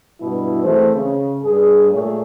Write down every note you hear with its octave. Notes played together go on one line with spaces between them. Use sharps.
G2 B2 E4
E3 A3 C4 G#4 C5
C#3
G2 G#4
A#2 A3 A#3 G#4 C#5